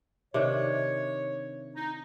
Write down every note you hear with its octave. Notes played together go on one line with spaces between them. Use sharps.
C3 D#3 D4 C#5
D#4